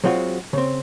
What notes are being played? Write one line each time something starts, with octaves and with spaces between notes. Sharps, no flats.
F#3 G#3 C4 F4 F#4
C#3 C4